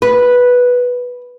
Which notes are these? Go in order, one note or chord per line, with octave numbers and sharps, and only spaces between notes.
B4